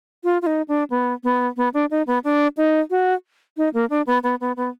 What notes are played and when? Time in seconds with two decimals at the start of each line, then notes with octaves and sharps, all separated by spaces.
0.24 F4
0.42 F4
0.46 D#4
0.68 D4
0.90 B3
1.24 B3
1.57 B3
1.74 D4
1.91 D#4
2.07 B3
2.24 D4
2.57 D#4
2.90 F#4
3.57 D#4
3.74 A#3
3.90 D4
4.07 B3
4.23 B3
4.41 B3
4.57 B3